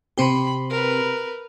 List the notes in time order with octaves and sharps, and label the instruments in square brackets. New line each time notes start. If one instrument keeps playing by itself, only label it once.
[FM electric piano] C3 C4 G4 [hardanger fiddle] B5
[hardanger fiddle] A#4 B4